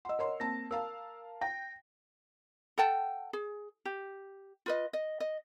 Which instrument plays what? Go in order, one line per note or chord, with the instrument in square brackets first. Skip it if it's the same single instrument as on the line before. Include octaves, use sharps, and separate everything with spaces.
[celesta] D#5 F#5 [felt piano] C6 E6
[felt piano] A#4 C#5 C6
[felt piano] A#3 C4 A5 [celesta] A#6
[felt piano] A#4 F5 A5 [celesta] E6
[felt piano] G5 [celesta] A#6
[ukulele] A4 F#5 G5 A5
G#4
G4
F4 B4 D#5
D#5
D#5